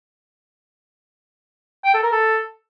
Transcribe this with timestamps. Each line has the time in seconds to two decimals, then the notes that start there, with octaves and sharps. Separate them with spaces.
1.85 G5
1.94 A4
2.03 A#4
2.12 A4